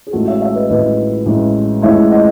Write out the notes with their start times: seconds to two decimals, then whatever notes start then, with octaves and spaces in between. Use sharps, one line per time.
0.07 G#4
0.13 A1 A2 E3 G#3 F#4 A4
0.28 C#5 E5
0.42 C#5 E5
0.55 B4 D#5
0.70 A1 A2 E3 G#3 B4 D#5
1.26 A1 A2 E3 G#3
1.82 A1 A2 E3 G#3 C#5 E5
2.11 D#5 F#5